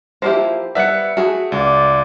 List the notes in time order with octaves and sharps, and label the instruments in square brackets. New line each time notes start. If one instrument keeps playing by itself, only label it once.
[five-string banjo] F3 A#3 E4 [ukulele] G4 C5
[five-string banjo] G3 B3 [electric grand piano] E5 F#6 C#7
[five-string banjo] A3 G#4 [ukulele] F#4
[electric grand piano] C#2 [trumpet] D5